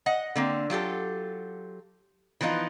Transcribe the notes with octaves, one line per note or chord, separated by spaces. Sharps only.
D#5 F#5
D3 A#3 C4
F#3 F4 G4 A4
E3 F3 B3 D#4 F4